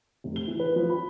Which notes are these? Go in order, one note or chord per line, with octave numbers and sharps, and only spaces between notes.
F1
G7
E3
B4
F3
B5